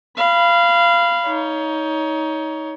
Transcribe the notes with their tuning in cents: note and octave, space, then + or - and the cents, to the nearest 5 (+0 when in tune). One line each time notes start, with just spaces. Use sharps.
F5 -20 B5 +0
D#4 +20 C#5 +20